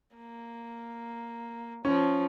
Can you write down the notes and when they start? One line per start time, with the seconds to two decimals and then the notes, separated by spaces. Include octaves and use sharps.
0.16 A#3
1.85 F3 C#4